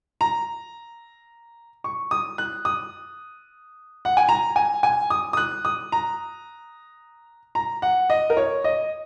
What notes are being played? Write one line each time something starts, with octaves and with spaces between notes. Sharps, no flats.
A#5
C#6
D#6
F#6
D#6
F#5
G#5
A#5
G#5
G#5
D#6
D#6
F#6
D#6
A#5
A#5
F#5
D#5
A#4
C#5
D#5